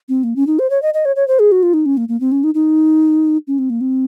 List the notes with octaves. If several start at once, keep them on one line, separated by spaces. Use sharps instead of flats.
C4
A#3
C#4
D#4
C5
C#5
D#5
D#5
C#5
C#5
C5
G#4
F#4
F4
D#4
C#4
A#3
A#3
C4
C#4
D#4
D#4
C#4
C4
A#3
C4